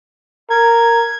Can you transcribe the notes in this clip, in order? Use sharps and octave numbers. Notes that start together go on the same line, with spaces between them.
A#4 G#6